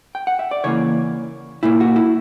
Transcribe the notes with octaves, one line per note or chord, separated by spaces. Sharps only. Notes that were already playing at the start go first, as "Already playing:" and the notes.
G5
F#5
E5
D5
C#3 E3 A#3 C#5
A#2 A#3 E4
F#4
E4